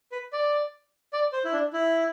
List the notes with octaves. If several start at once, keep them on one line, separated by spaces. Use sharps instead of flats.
B4
D5
D5
C5
E4
D4
E4